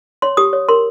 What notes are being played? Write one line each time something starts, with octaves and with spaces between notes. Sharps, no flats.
C#5 C6
G4 D#6
C#5
A#4 C6